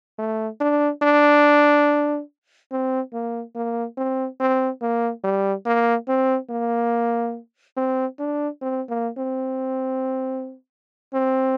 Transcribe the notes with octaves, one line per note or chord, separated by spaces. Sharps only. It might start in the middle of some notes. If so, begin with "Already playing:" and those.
A3
D4
D4
C4
A#3
A#3
C4
C4
A#3
G3
A#3
C4
A#3
C4
D4
C4
A#3
C4
C4